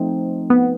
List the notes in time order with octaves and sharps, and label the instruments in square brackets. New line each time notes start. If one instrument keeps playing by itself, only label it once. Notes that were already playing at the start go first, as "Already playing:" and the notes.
Already playing: [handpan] F3 A3 C4 D#4
[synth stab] B3